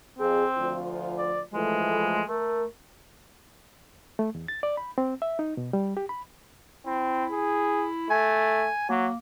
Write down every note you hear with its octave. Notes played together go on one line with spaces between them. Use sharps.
F2 C4 G#4
D2 F3 F4
D5
E3 F3 G#3 A3
A3 A#4
A3
E2
A6
D5
B5
C4
E5
D#4
B2
G3
G4
B5
C4 E4
G#4
A3 G#5
F#3 A#3